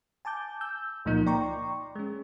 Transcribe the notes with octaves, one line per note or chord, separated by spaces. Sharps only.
G#5 A5 D6 G6
E6 G6
C#2 A#2 F3 A#3 D#4 G6
D5 G5 A#5 C6 C#6
G#3 C#4